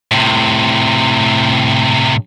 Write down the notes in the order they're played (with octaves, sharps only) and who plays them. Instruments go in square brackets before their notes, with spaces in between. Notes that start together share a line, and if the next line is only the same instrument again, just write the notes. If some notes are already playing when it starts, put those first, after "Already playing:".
[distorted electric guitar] A2 C3